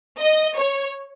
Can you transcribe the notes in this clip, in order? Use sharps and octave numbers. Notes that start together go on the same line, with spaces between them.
D#5
C#5